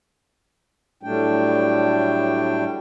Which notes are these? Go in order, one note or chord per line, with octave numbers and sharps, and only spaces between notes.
A2 F#3 G3 A3 D4 G5